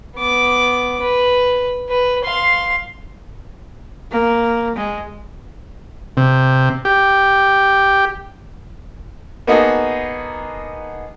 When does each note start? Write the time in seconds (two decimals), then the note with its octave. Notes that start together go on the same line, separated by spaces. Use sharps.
0.18 B3 D6
1.02 B4
1.89 B4
2.25 F5 C6
4.12 A#3
4.76 G#3
6.17 C3
6.85 G4
9.47 A#3 B3 D#4 F#4 G#4 A4